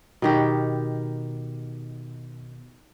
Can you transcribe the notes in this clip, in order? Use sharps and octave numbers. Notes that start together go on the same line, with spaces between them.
B2 D#3 G4